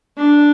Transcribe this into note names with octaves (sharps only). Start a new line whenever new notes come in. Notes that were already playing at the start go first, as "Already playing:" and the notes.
D4